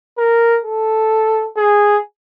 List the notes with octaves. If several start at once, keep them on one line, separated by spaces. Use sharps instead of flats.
A#4
A4
G#4